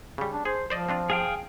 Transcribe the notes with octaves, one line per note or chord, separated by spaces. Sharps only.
C#3 G3
D4
G#4 C5
F3 C5 D5 D#5
C4 D4 F4
G#4 F5 G5